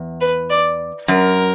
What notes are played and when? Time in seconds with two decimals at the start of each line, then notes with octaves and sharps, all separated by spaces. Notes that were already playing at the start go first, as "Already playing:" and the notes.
Already playing: E2
0.21 B4
0.50 D5
1.08 F#2 A#4